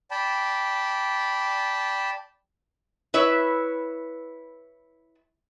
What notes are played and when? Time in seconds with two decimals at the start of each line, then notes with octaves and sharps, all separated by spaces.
0.11 D5 G5 A5 B5
3.14 E4 B4 C#5 E5